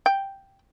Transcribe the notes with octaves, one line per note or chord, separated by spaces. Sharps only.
G5